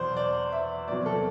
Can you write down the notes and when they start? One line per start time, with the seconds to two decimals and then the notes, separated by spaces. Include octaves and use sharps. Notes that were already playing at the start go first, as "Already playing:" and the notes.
Already playing: E2 B2 F#3 C5 D5
0.17 D5
0.52 E5
0.88 E2 C3 F#3 D5
1.06 A4